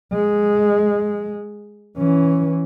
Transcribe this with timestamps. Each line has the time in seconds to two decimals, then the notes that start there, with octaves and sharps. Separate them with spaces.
0.13 G#3
1.97 E3 C#4